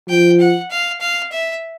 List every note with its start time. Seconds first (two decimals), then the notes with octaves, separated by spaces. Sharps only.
0.08 F3 G5
0.40 F#5
0.70 F5
1.01 F5
1.32 E5